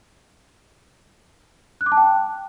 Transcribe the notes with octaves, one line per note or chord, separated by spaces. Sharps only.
F#6
D6
A5
G5